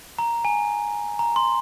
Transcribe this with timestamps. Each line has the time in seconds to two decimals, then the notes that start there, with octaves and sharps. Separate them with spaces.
0.19 A#5
0.45 G#5
1.19 A#5
1.36 C6